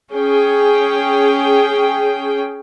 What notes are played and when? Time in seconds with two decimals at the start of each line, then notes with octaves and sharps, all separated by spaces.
0.12 C#4 G#4 G5